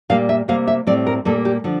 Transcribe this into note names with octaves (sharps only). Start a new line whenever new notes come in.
A#2 G3 A#3 F5
E5
C3 G3 A#3 F5
E5
A2 G3 C4 D5
A#4
A#2 G3 A#3 A4
G4
D3 F3